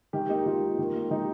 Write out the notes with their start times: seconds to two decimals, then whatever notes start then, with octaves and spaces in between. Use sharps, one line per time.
0.13 D#3 G4 A#4
0.29 A#3 D#4 G4
0.46 D#3 F4
0.62 A#3
0.78 D#3
0.95 A#3
1.10 D#3 D#4 G4